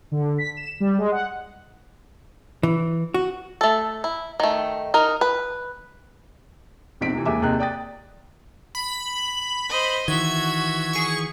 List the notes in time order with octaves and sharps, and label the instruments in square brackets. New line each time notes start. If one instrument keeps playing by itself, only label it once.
[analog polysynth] D3
B6
E7
G3
G#3
F#5
[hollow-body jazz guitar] E3
F#4
[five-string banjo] A3 A4
E4
D#3 A3
D#4 A#4
B4
[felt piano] A#1 B2 C4 D#4 B6 D7
C3 E3
D#2 G#3 E5 G#5 D6
D#2 C3 G#4 D#5 G5 F#6
D5 G5 D#6 A6
[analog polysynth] B5
[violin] C5 D#5
[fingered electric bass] D#3 E3 [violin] F#4 E5 [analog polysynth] G#6
[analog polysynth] G#4 C#6